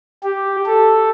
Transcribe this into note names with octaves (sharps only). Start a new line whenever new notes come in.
G4
A4